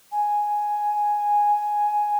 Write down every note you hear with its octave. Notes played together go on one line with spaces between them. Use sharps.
G#5